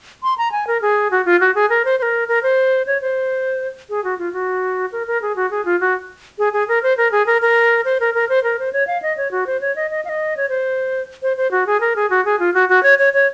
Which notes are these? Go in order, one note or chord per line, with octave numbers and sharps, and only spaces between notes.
C6
A#5
G#5
A#4
G#4
F#4
F4
F#4
G#4
A#4
C5
C5
A#4
A#4
C5
C#5
C5
G#4
F#4
F4
F#4
A#4
A#4
G#4
F#4
G#4
F4
F#4
G#4
G#4
A#4
C5
A#4
G#4
A#4
A#4
C5
A#4
A#4
C5
A#4
C5
C#5
F5
D#5
C#5
F#4
C5
C#5
D#5
D#5
F5
D#5
C#5
C5
C5
C5
F#4
G#4
A#4
G#4
F#4
G#4
F4
F#4
F#4
C#5
C#5
C#5